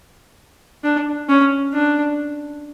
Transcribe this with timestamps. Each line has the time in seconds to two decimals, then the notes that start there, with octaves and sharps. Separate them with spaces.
0.84 D4
1.29 C#4
1.73 D4